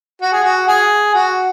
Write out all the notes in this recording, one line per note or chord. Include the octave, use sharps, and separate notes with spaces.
F#4
G#4
F#4
G#4
F#4